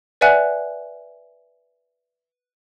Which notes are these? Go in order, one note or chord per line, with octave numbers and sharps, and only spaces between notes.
B4 D5 E5 F#5 G#5 F#6